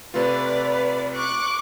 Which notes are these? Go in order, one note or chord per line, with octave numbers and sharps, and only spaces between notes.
C3 A3 F4 B4 D5
C#6 D6 F#6